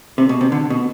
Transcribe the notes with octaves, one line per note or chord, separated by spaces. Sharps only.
C3
B2
C3
D3
B2